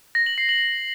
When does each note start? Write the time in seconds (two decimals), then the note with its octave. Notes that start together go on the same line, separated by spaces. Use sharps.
0.15 A#6
0.26 F#7
0.38 C7
0.49 F#7